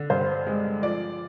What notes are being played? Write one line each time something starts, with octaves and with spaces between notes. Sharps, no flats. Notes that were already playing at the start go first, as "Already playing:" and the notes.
Already playing: D3
G2 C5
G#3
F3 D5